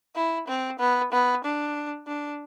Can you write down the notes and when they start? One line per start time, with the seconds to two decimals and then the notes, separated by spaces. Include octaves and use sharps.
0.15 E4
0.48 C4
0.79 B3
1.12 B3
1.44 D4
2.07 D4